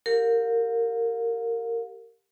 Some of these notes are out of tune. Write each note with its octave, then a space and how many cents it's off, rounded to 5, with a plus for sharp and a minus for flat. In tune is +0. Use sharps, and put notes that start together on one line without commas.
G4 +0 A#4 -20 F5 +40